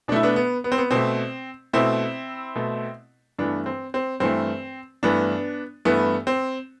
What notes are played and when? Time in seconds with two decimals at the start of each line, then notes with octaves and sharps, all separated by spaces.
0.08 B2 D4
0.12 A3 E4
0.23 B3 D4
0.36 B3
0.64 B3
0.72 C4
0.78 B3
0.91 B2 A3 C4
1.73 B2 A3 C4 E4
2.55 B2 A3
3.39 G2 E3 A3 B3 D4
3.66 C4
3.94 C4
4.20 G2 E3 A3 C4
5.03 G2 E3 A3 B3 D4
5.85 G2 E3 A3 B3
6.27 C4